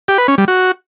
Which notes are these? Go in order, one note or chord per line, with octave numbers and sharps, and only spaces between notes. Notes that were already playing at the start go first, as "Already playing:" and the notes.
G4
B4
C#4
G3
F#4